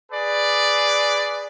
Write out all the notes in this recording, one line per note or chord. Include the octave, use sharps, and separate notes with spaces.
G#4 B4 D5